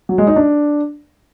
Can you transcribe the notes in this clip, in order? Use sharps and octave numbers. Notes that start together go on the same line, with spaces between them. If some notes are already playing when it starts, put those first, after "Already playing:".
F#3
G#3
D#4
D4